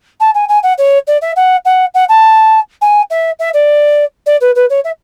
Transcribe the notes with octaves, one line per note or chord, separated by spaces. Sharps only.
A5
G#5
G#5
F#5
C#5
D5
E5
F#5
F#5
F#5
A5
G#5
E5
E5
D5
D5
B4
B4
C#5
E5